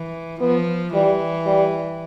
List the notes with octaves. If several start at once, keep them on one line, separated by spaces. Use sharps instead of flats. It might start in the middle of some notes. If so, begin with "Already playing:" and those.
Already playing: E3
F3 B3
E3 G3
G3